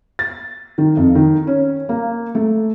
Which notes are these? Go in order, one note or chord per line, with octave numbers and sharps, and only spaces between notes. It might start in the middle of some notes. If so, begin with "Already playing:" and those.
A6
D#3
F2
D#3
C#4
A#3
A3